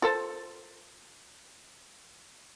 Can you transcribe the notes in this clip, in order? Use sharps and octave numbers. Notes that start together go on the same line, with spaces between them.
F4 A4 C5